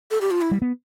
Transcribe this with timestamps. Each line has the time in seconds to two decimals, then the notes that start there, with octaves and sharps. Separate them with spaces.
0.11 A4
0.21 G4
0.31 F4
0.41 E4
0.51 G3
0.62 B3